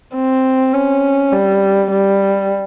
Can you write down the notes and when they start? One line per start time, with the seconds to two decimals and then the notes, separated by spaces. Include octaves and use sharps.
0.15 C4
0.73 C#4
1.32 G3
1.91 G3